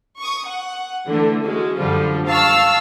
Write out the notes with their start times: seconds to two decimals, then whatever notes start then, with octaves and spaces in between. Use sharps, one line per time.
0.19 C#6 D#6
0.47 F#5
1.07 D3 E3 A3
1.43 G#3 C#4 F#4
1.78 F#2 D3 F3 G3 F4
2.27 F5 A5 C#6 E6 F6